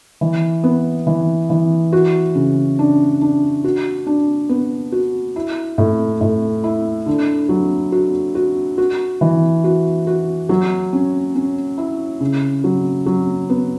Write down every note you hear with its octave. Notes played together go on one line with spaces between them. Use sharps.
E3
B3
E3
E3
F#4
C#3
D4
D4
F#4
D4
B3
F#4
E4
A2
A2
E4
D3
F#3
F#4
F#4
F#4
E3
F#4
F#4
F#3
C#4
C#4
E4
C#3
F#3
F#3
B3